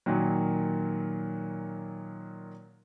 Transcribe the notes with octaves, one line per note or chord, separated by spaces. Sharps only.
A#2 D#3 F#3